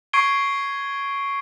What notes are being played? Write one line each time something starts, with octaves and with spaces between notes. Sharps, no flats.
C#6 G#6 C7 D7 G7